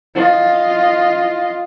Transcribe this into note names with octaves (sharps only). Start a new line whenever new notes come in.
F4 D#5